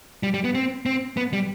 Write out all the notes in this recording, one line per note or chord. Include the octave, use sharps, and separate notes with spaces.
G3
G3
B3
C4
C4
B3
G3